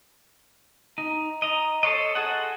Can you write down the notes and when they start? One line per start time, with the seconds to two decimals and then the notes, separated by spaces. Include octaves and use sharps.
0.98 D#4
1.42 D#5 A#5
1.83 A4 C5 C#5 D#5
2.15 F#4 G#4 A4 D#5 F#5